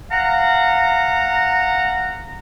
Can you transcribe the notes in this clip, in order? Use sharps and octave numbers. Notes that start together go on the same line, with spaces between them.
F5 F#5 A#5